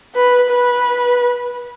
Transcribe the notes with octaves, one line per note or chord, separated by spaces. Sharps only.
B4
B4